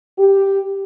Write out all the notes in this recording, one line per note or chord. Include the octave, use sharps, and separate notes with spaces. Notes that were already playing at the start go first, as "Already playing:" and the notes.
G4